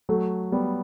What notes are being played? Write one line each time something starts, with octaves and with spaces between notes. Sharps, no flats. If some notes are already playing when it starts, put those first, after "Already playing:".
F#3 A3
G3 B3